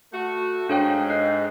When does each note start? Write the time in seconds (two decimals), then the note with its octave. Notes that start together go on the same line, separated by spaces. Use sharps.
0.13 A3 F#4
0.69 G#2 D4 A4 C#5 F5 G5
1.10 D4 D#5 F#6 C7